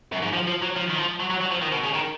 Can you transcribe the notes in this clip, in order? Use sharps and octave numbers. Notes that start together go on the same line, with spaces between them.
F#2
G#2
F3
F3
F#3
F3
D#3
F3
F#3
F#3
F#3
F3
D#3
B2
C#3
D#3